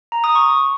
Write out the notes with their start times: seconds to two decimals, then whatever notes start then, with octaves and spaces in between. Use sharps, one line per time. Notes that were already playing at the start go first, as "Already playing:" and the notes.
0.12 A#5
0.24 D#6
0.35 C#6